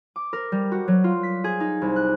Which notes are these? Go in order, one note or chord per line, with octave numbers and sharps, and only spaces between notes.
D6
A#4
G3
F#4
F#3
F4
B6
G#4
D#4
C2
F#6